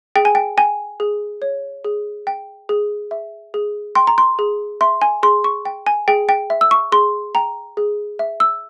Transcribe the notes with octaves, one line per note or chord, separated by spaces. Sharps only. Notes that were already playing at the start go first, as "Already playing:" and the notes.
G#4 G5
G#5
G5
G5 G#5
G#4
C#5
G#4
G5
G#4
E5
G#4
G5 C6
A#5
C6
G#4
E5 C6
G#5
G#4 C6
C#6
G5
G#5
G#4 G5
G5
E5
E6
C#6
G#4 C6
G5 A#5
G#4
E5
E6